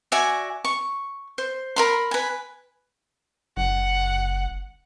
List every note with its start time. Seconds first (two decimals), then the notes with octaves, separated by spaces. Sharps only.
0.12 F#4 D5 E5 G#5
0.65 C#6
1.38 C5
1.76 A#4 B5 C6
2.11 B4 G#5
3.57 F#1 F#5